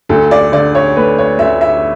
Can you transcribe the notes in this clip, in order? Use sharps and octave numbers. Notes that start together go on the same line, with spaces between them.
D2 A4
D5
D3 D5
C#5
A3 B4
C#5
D2 E5
E5